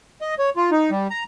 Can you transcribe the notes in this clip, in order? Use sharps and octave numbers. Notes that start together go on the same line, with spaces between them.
D#5
C#5
F4
D#4
G3
A#5